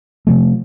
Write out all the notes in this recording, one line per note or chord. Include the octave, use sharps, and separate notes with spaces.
C3 F3 A3